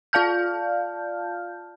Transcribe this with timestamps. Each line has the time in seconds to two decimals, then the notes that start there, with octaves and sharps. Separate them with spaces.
0.13 F4 D5 F5 A5 F6 G6